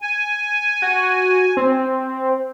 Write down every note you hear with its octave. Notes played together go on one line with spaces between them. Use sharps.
G#5
F#4
C4